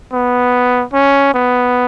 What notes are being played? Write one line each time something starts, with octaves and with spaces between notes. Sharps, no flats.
B3
C#4
B3